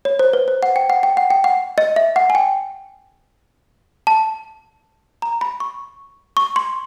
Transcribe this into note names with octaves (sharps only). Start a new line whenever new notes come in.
C#5
C5
B4
C5
F#5
G5
F#5
G5
F#5
G5
F#5
D#5
E5
F#5
G#5
G5
A5
A#5
B5
C#6
C#6
C6